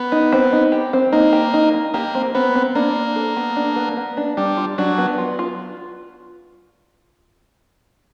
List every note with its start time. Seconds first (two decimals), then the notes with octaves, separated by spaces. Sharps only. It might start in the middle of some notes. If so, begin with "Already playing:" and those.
Already playing: B3
0.12 D#4
0.32 C4
0.53 D#4
0.72 G4
0.93 C4
1.12 A#3 D#4
1.33 G4
1.54 D#4
1.74 D#4
1.94 A#3 G4
2.15 C4
2.34 B3 C4
2.55 C4
2.75 A#3 D4
2.96 D4
3.16 A4
3.37 B3
3.56 D4
3.76 B3
3.97 B3
4.17 D4
4.37 G3 D4
4.57 F4
4.78 F#3 D4
4.98 B3
5.18 F4
5.39 F4